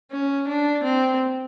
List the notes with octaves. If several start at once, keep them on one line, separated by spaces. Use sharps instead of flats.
C#4
D4
C4